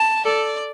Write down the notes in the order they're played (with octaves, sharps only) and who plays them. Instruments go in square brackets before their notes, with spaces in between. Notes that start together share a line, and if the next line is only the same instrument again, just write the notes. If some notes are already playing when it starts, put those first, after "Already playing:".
Already playing: [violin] A5
[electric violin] A4 [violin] D5